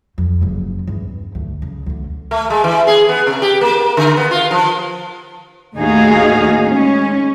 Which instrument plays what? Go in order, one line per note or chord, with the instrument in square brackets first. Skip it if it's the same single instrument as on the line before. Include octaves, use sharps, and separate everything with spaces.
[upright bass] F2
F#1 C#3
E2 G2
D2
C#3
D2 D3
[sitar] A3
G#3
E3
G#4
B3
C3
G4
A#3
D3
B3
F4
F3
[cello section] D#2 A2 D#4 F#4 G#4 F5
G#3 C#4